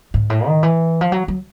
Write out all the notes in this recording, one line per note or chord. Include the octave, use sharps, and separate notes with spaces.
G#2
A2
D#3
E3
F3
F#3
F#3